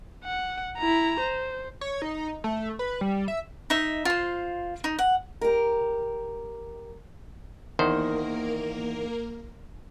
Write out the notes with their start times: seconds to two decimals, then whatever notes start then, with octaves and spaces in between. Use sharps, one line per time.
0.24 F#5
0.78 E4 A#5
1.20 C5
1.81 C#5
2.02 D#4
2.44 A3
2.79 B4
3.01 G3
3.28 E5
3.70 D#4 E5
4.05 F4 C5
4.84 D#4
4.99 F#5
5.41 G4 A#4
7.79 E2 D#3 A#3 A#4 C5